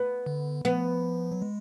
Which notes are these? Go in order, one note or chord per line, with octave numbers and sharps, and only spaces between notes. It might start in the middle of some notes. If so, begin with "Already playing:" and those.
Already playing: B3
D3
F3 B3
F#3
G#3